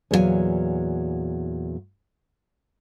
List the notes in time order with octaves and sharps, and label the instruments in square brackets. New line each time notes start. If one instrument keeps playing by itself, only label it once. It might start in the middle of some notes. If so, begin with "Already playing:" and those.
[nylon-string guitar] E2 A#2 F#3 F#4 F5 G#5